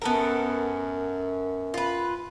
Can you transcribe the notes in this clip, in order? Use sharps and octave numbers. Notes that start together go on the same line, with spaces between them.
F#2 B3 A4 A#4
F4 B4